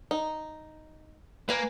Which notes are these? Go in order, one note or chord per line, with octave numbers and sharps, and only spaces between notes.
D#4
A#3 B4 G#5